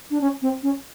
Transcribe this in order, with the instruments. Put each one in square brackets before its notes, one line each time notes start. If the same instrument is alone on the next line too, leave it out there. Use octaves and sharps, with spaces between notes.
[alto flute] D4
C#4
C4
C#4